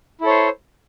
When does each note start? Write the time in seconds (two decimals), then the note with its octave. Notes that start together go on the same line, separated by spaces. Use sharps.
0.21 E4
0.24 A4
0.27 C#5
0.30 C5